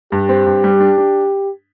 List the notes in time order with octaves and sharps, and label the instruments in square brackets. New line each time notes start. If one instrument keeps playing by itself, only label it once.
[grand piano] G2 [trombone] G4
[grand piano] C4
G2
G3
D4
D4